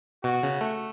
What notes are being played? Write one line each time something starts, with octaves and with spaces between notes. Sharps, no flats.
B2 F#4
C#3
A3